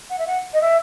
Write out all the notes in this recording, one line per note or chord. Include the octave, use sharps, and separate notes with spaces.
F#5
E5
F#5
D#5
E5